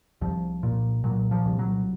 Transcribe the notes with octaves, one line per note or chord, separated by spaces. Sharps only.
C2 F3
A#2
A#2 F#3
F3
C2
F#3